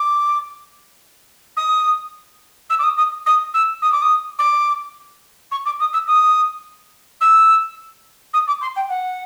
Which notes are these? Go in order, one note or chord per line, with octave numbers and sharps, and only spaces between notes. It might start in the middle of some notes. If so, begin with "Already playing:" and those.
Already playing: D6
D#6
E6
D6
D#6
D#6
D#6
E6
D#6
D6
D#6
D6
C#6
D6
D#6
E6
D#6
E6
D#6
D6
C6
G5
F#5